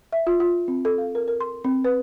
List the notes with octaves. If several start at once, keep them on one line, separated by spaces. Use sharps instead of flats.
E5
F4
F4
C4
A4
F5
A#4
A#4
C6
C4
B4